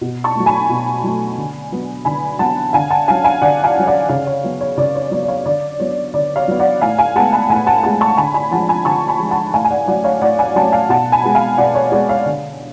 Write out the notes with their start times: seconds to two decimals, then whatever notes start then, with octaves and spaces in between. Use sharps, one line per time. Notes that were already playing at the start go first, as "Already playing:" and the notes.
0.01 B2
0.24 A5 C#6
0.35 F#3 A3
0.46 G#5 B5
0.70 B2
1.04 F#3 A3
1.38 D3
1.72 F#3 B3
2.05 D3 G#5 B5
2.39 F#3 B3 F#5 A5
2.73 D3 F5 G#5
2.90 F#5 A5
3.08 F#3 C#4 F5 G#5
3.24 F5 G#5
3.42 D3 D5 F#5
3.64 F5 G#5
3.76 F#3 C#4
3.87 D5 F#5
4.09 C#3 C#5 F5
4.27 C#5
4.44 F#3 B3
4.61 C#5
4.77 C#3 D5
4.95 C#5
5.11 F#3 B3 D5
5.22 D5
5.28 C#5 F5
5.46 D3 D5
5.80 F#3 B3 C#5
6.14 D3 D5
6.36 C#5 F5
6.48 F#3 B3
6.60 D5 F#5
6.81 A2 F5 G#5
6.98 F5 G#5
7.16 G#3 B3 F#5 A5
7.33 G#5 B5
7.50 A2 G#5 B5
7.67 F#5 A5
7.83 G#3 B3 F#5 A5
8.01 A5 C#6
8.17 D3 G#5 B5
8.34 G#5 B5
8.51 F3 G#3 F#5 A5
8.68 G#5 B5
8.85 D3 A5 C#6
9.08 G#5 B5
9.20 F3 G#3
9.31 F#5 A5
9.54 A2 F5 G#5
9.65 G#5
9.71 D5 F#5
9.88 F#3 C#4 D5 F#5
10.04 C#5 F5
10.21 A2 D5 F#5
10.39 F5 G#5
10.56 F#3 C#4 F#5 A5
10.72 F5 G#5
10.89 B2 F#5 A5
11.12 G#5 B5
11.24 G#3 B3
11.35 F5 G#5
11.58 B2 D5 F#5
11.75 C#5
11.92 G#3 B3 D5
12.09 C#5 F5
12.26 D3